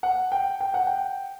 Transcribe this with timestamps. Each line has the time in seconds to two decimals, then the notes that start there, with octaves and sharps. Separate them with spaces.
0.03 F#5
0.32 G5
0.61 G5
0.74 F#5
0.87 G5